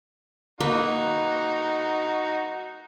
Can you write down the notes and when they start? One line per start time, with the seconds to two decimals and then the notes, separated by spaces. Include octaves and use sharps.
0.60 A#3 D#4 F#4 B4